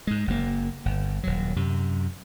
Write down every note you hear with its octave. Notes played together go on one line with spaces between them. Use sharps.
G#2 G#3
F#1 F#2 A#3
G1
D#1 F#3
F#2 C3